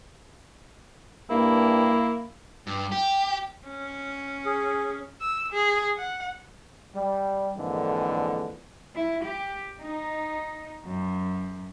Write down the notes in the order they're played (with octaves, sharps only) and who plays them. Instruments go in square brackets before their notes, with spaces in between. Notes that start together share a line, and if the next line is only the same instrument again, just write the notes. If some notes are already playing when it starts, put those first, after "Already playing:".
[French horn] G2 [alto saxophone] A#3 [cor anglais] E4
[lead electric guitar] G2
G4
[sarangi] C#4
[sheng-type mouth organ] G#4
[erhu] E6
G#4
F#5
[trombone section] G3
A#1 F2 G#2 D3 E3
[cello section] E4
G4
D#4
F#2